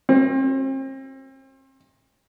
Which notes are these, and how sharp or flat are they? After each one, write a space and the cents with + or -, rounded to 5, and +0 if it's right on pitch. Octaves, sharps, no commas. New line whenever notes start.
C4 +40